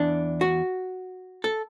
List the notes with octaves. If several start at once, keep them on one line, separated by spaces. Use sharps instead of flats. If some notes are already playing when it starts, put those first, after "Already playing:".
Already playing: E2 E3 D4
F#4
A4